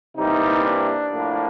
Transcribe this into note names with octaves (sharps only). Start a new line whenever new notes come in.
C3 E3 G3 A#3 D#4
D4
A2 F3 A#3